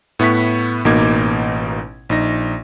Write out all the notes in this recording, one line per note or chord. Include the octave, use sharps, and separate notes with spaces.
A2 B3 E4 C#6 B6
A1 B2 A#3 D#4 D6 G#6
A#1 D#4 A#6